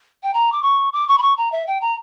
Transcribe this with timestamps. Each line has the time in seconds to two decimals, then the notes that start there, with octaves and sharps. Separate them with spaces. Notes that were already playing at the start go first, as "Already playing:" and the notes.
0.23 G5
0.33 A#5
0.52 D6
0.62 C#6
0.93 D6
1.08 C#6
1.18 B5
1.22 C#6
1.37 A#5
1.52 E5
1.67 G5
1.81 A#5